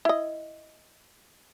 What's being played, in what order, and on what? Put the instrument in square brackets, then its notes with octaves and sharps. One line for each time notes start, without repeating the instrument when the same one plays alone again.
[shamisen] E4 D#5